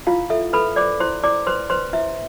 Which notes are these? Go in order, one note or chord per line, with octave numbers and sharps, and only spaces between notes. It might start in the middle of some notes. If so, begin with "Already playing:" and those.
E4 F4 F5
A4 E5
A4 B4 B5
C5 D5 D6
E4 C5 C6
E4 D5 D6
B4 C5 C6
B4 C5 C6
E4 E5